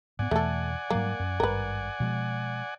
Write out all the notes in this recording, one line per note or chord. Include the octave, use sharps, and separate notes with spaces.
G#2 G#3 B3 D5 F#5 G#5
E2 B2 E3 A3 A4
G#2 F#3 G3 A#3
F#2
G#1 G2 A#4 B4
B2 F3 G#3